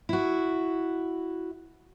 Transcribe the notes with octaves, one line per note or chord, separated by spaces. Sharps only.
E4 F#4